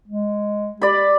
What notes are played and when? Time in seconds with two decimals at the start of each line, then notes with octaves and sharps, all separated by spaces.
0.07 G#3
0.82 G4 D5 B5